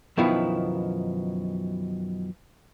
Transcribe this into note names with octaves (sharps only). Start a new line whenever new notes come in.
F#2 B2 D#3 F3 E4